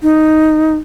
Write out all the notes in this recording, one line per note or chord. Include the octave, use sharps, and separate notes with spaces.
D#4